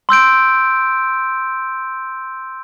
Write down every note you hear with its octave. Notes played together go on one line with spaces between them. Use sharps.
C6 E6 G6 D7